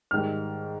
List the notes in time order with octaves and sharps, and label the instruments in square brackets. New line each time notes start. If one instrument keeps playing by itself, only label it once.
[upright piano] G#2 D#3 G3 F6